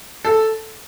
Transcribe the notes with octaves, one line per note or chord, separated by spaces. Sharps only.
A4